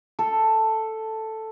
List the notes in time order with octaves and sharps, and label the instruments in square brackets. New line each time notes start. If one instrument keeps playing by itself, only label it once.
[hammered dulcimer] A4